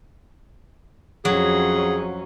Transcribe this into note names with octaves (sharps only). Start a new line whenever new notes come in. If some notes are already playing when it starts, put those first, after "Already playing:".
F2 F#3 C#4 G#4